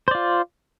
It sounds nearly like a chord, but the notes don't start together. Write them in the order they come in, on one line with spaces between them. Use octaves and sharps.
C5 D5 F4